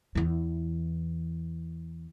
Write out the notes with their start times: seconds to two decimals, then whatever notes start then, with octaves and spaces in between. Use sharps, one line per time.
0.15 E2 E3